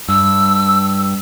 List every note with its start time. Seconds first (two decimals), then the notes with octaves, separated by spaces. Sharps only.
0.08 G2 E6